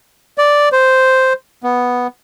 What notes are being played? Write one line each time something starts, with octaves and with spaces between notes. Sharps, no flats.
D5
C5
B3